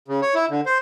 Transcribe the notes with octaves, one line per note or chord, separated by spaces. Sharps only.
C#3
C#5
E4
D3
C5